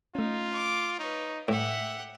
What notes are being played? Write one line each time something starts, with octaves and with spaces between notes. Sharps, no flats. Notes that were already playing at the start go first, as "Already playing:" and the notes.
A3 C#4 D#4 F4
D6
D#4 B4 C#5
A2 G4 E5 F#5